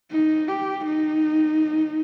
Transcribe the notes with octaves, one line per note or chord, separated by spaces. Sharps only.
D#4
G4
D#4